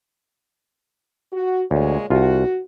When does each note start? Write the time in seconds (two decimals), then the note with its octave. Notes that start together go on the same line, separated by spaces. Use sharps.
1.32 F#4
1.71 D2 A#2 G#3 C#5
2.10 C2 F4 F#4